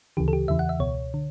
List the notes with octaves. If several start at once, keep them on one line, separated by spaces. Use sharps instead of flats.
D2 C#3 E3 G4
A4
G4
E2 C#3 E3 E5
F#5
E5
C#2 B2 C#5
D3